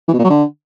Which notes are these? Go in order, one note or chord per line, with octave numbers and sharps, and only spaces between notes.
E3
B2
A#2
F#3
D3